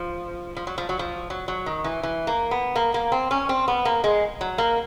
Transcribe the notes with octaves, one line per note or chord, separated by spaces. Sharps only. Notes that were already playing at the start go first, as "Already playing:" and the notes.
Already playing: F3
F3
F#3
F3
F#3
F3
F#3
F#3
D#3
E3
E3
A#3
B3
A#3
A#3
C4
C#4
C4
B3
A#3
G#3
F#3
A#3